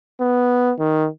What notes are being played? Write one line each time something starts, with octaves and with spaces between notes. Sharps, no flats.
B3
D#3